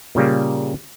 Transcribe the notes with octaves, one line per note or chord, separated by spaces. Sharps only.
A#2 C#3 G3 A#3